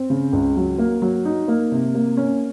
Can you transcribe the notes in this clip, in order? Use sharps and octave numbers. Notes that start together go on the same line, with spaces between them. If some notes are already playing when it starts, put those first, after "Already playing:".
Already playing: C4
C#3
C#2
F#3
A#3
F#3
D#4
A#3
C3
A#3
C#4